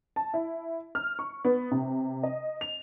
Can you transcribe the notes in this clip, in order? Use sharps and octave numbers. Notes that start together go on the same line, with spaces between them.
A5
E4
F6
C#6
B3
C3
D#5
F7